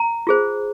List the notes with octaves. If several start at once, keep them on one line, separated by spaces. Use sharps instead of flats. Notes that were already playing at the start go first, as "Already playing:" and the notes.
Already playing: A#5
F4 G#4 C5